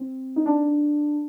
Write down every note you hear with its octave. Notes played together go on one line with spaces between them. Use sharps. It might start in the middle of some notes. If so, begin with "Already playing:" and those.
Already playing: C4
D#4
D4